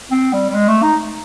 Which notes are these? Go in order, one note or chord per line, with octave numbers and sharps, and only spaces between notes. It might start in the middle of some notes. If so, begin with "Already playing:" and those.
C4
G3
G3
G#3
A3
D#4